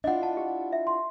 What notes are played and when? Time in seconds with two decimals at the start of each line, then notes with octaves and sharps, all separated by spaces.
0.04 D4 E4 F4 D#5 F#5
0.23 F#5 A5
0.37 G4
0.72 E5
0.87 C6